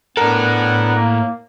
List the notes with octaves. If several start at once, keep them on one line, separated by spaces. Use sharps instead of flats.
A2 B3 D4 A4 A#4 F#5
A#3